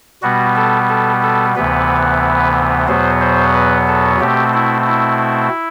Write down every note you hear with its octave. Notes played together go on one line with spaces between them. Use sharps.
B2 G3 B3 F#4
A4
A4
A4
D2 C3 E3 B3 B4
E2 B2 F#3 B3 C5
C5
B4
A4
B2 A3 C4 G4
E4
E4